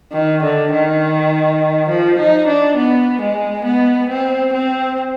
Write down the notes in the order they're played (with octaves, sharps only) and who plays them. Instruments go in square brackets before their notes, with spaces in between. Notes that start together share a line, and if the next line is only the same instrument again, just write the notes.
[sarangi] D#3
D3
D#3
F3
D#4
D4
B3
G#3
B3
C4
C4